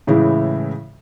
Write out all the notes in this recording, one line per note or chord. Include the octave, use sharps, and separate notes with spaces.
A2 C#3 E3 G#3 E4